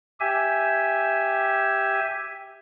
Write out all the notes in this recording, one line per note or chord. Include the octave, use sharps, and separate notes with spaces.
G4 E5 G#5